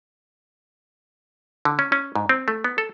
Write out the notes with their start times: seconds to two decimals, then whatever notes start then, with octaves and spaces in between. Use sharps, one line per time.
1.65 D3
1.79 C#4
1.92 C#4
2.15 G#2
2.29 C4
2.48 A3
2.64 B3
2.78 A4